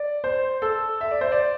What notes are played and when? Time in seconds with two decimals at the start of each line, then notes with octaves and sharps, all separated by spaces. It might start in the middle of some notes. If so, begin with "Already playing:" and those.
Already playing: D5
0.24 C5
0.62 A4
1.01 E5
1.11 D5
1.21 C5
1.32 D5